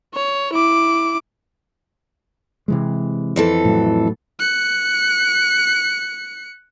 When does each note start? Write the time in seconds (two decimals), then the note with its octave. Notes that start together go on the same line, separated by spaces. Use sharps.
0.15 C#5
0.54 E4 D6
2.68 C3 E3 G#3
3.36 F2 E3 A4
3.65 A2 F#3
4.39 F#6 C#7